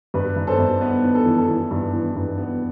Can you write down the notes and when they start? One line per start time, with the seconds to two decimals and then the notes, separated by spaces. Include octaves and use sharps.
0.14 G2 B4
0.36 G2
0.47 A4 C5
0.59 G2
0.81 B3 B4
1.04 B3
1.15 A4
1.26 E3
1.38 A4
1.49 E3
1.71 G2
1.94 E3
2.15 G2
2.38 B3